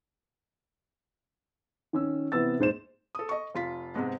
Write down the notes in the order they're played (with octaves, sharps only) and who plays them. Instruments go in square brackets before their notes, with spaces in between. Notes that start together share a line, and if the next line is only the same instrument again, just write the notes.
[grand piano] D#3 C#4 E6
C3 E3 B3 E6 A6
D#1 G#2 C5 E7
[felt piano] A4 D#6
D#5 C#6
F1 F4 B6
G#2 C3 G#3 B3